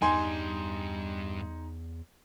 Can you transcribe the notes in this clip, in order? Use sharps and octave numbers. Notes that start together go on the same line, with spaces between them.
E2 G2 G3 D#4 G#5 C6